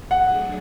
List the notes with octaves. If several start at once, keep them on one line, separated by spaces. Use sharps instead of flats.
F#3 A3 D4 G#4 F#5